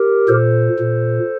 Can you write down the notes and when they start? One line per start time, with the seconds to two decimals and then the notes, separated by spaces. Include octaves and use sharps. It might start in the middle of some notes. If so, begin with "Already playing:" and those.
Already playing: G4 A#4
0.29 A#2 A4 C5
0.79 A#2